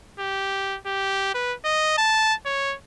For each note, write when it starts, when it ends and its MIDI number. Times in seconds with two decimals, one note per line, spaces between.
0.19 0.77 67
0.86 1.34 67
1.34 1.54 71
1.65 1.96 75
1.98 2.34 81
2.45 2.75 73